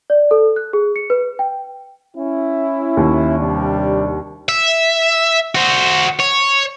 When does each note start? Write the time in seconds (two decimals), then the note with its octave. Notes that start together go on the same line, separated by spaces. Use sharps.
0.10 D5
0.31 A4
0.56 F#6
0.73 G#4
0.96 C#7
1.10 B4
1.39 G5
2.17 C#4 E4
2.97 D#2
3.39 C3 G3 D4
4.49 E5
5.55 F#4 C5
6.20 C#5